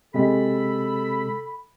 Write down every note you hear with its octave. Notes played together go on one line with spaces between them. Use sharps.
C3 G#3 A4 B5